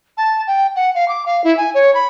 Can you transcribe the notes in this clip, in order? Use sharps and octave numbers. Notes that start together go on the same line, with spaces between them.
A5
G5
F#5
F5
D6
F5
E4
G#5
C#5
B5